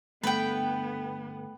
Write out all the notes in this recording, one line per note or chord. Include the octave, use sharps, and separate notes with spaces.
G2 D3 A3 B3 B4 G5